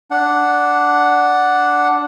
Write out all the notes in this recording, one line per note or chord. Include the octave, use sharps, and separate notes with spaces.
D4 F#5